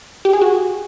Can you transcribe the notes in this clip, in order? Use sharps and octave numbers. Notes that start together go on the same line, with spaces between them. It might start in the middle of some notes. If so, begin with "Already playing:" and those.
G4
G#4
F#4